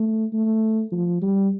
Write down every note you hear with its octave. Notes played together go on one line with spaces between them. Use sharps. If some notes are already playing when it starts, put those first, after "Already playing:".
Already playing: A3
A3
F3
G3